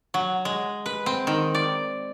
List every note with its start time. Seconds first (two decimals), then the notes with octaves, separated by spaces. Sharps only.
0.14 F#3
0.45 G#3
0.86 B4
1.06 C4
1.27 D#3
1.55 D5